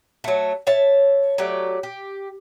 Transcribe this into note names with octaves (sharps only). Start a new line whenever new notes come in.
F#3 A3
C#5 E5 A5
F#3 A3 G4 D5
G4